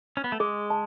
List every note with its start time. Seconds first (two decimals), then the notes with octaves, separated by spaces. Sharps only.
0.17 C#4
0.24 B3
0.32 A3
0.40 G#3 G#4
0.70 A5